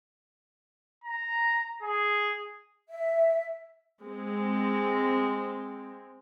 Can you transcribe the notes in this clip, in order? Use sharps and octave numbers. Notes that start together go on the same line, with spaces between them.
A#5
G#4
E5
G#3 C4